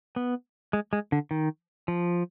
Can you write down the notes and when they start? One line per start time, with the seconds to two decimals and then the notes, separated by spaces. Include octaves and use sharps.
0.16 B3
0.73 G#3
0.93 G#3
1.12 D3
1.31 D#3
1.88 F3